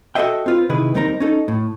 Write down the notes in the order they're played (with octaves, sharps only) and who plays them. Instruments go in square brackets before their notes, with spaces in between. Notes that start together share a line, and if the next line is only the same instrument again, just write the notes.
[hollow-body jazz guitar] F#4 A4 C5 D#5 E5 G5
C4 F4 B4
C3 D#3 E4 G#4 B4
D#2 G3 C4 D#4 A#4 A#5
C#4 D#4 A4
A2